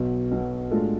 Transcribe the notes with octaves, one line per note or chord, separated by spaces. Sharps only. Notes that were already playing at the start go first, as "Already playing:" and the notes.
Already playing: B1 B2 F#3 B3
B1 B2 F#3 B3
A2 G#3 D4 F4 A4